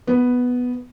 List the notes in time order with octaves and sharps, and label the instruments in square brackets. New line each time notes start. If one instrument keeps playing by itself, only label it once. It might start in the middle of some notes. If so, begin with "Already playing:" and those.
[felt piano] B3